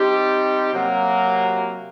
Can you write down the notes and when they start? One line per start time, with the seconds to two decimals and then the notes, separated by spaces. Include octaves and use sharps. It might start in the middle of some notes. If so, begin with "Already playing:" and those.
Already playing: G3 C4 D#4 G4
0.73 C3 F#3 A#3